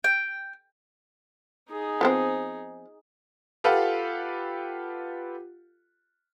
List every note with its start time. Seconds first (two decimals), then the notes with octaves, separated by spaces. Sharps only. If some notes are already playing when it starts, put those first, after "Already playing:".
0.04 G5
1.70 D#4 G#4
2.01 F3 B3 C4
3.64 F4 G4 A4 B4 F5 F#5